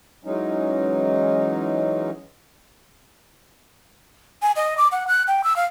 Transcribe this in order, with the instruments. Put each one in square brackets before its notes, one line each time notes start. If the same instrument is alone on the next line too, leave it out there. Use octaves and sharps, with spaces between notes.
[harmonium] E3 F#3 G#3 C#4 D#4
[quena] G#5
D#5
D6
F#5
F#6
G5
E6
F5